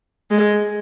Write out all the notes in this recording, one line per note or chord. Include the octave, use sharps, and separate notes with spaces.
G#3